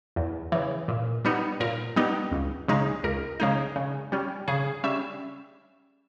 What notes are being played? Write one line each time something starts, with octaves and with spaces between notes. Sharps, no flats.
E2
C#3 E3
A#2
G3 B3 D#4
A#2 A#4
G3 B3 D#4
C#2
C#3 G#3 D#4
C#2 A#4
C#3 G#3 D#4
C#3
G3 C#4
C#3 G#4
G3 C#4 E5